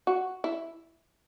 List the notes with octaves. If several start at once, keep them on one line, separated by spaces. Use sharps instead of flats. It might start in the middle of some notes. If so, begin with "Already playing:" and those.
F#4
E4